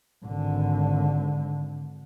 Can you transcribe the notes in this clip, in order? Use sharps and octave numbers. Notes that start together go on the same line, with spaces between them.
G#1 D3